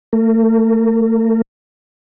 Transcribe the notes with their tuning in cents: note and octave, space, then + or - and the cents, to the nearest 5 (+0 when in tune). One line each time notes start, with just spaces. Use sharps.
A3 +30 A#4 -25